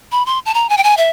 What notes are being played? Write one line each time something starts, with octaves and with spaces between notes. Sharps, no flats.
B5
C6
A5
A#5
G#5
G5
G#5
E5